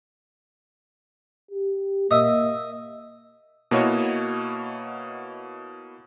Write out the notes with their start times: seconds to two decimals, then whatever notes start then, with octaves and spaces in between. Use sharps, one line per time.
1.51 G4
2.11 A#3 D#5 E5
3.71 B2 A#3 E4 F#4 C#5 D#5